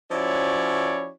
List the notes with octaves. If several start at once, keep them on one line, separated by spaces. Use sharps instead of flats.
F3 C#4 E4 F#4 C#5 D5